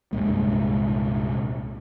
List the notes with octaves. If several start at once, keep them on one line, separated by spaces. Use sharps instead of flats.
C2 G2 A#2 G#3